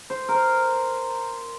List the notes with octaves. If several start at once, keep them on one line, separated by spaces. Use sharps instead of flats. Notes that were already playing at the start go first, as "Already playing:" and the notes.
C5
A#4
C5